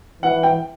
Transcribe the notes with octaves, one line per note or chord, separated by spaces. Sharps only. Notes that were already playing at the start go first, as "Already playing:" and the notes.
E3 F#5
G5